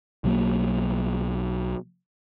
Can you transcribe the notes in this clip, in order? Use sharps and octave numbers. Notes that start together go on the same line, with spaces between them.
B1 F#3 A#3